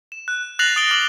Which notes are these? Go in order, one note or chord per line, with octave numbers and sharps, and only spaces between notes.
E7
F#6
F#6 A6 A#6 C7 F7 F#7
D#6 A6 D7 G7
D6 F6 F#7